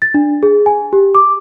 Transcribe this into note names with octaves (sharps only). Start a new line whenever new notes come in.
A6
D4
G#4
G#5
G4
D6